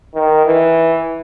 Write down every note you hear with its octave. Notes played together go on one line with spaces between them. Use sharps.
D#3
E3